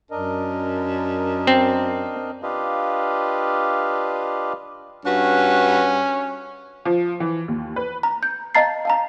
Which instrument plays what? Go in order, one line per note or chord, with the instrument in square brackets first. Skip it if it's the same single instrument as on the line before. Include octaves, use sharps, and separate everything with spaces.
[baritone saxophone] F#2 [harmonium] D4 A#4 D#5
[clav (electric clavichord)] C4
[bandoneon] D4 F4 G4 B4 D#5 F5
[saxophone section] G2 F#4 B4 [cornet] C#4
[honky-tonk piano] F3
E3
D#2
B4
[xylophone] A#5
G6
D#5 F5 A5 A#5 A6 C7
F5 A5 A#5